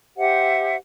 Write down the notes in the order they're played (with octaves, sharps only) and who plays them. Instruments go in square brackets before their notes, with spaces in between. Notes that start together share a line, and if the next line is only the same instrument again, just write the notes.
[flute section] G4 C5 E5 F#5